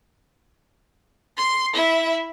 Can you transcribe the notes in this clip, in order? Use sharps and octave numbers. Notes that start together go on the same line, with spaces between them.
C6
E4 E5